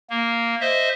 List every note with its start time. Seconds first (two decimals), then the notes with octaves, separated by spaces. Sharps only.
0.10 A#3
0.61 C5 D#5 E5